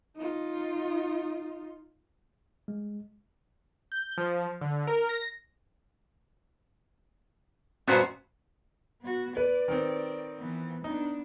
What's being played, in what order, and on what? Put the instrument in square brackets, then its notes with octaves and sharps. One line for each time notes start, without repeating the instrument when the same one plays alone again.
[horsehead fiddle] D#4 F4
[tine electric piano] G#3
[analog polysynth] G6
F3
D3
A#4
A#6
[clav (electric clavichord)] G2 A#2 B3 [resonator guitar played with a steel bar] C#4 F#4 C5
[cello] B3 F#4
[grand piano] B4 [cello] D5
[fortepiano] D#3 C4
[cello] E3 B3
[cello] B3 D4 [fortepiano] D#4